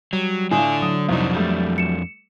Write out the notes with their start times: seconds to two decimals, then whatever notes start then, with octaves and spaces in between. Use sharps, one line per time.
0.13 F#3 G3
0.51 A2 D3 D4 F4 G#5 D#6
0.82 F#3 D#6
1.09 C2 F2 D4 D#4
1.35 G3 A3
1.78 C#7 E7